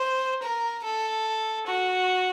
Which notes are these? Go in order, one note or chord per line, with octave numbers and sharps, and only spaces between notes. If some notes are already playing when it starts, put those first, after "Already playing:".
Already playing: C5
A#4
A4
F#4